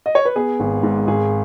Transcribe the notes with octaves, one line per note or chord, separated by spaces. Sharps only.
D#5
C#5
B4
B3 G#4
G#1
G#2
G#1 G#4